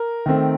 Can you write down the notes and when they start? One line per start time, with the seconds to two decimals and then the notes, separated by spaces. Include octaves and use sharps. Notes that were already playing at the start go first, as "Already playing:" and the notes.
Already playing: A#4
0.26 D#3 A3 C4